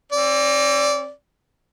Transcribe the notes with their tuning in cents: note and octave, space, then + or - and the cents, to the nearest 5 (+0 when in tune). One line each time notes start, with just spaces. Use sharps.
C4 +40 D5 -15